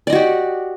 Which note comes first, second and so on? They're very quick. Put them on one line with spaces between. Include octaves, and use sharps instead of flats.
D5 D#5 F#4 G4